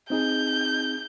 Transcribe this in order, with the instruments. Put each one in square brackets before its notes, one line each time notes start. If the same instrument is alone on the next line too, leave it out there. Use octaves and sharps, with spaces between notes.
[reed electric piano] C4 D#4 G#4 [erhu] G6